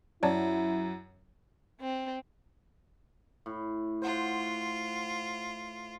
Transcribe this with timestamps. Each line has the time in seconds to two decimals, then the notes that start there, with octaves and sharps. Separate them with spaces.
0.23 F#2 E4 C#5 D5 A5
1.81 C4
3.46 A2
4.02 F4 C5 F#5 C6